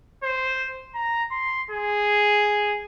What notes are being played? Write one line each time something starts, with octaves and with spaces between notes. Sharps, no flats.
C5
A#5
C6
G#4